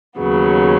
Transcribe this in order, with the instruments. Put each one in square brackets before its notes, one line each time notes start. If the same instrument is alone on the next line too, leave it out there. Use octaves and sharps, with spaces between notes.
[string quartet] D#2 C#3 F#3 B3